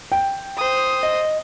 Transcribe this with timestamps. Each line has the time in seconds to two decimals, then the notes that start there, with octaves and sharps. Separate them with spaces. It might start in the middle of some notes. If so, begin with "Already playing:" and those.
0.12 G5
0.57 C5 D#6
1.03 D#5